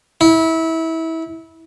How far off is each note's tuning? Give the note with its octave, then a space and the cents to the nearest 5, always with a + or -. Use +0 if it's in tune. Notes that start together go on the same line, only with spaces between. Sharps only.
E4 -25